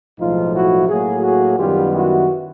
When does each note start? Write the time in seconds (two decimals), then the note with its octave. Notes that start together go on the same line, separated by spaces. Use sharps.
0.19 B1 A2 F3 G#3 D#4 F4
0.54 E4 F#4
0.88 A2 F#3 A#3 F#4 G#4
1.22 F#4 G#4
1.58 F#2 D#3 G3 B3 F4 G4
1.93 E4 F#4